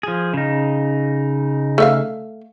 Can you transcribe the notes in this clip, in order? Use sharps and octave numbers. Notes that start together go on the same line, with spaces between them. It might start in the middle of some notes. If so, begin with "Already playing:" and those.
F3 G#4
C#3 D#4
A3 E5 F5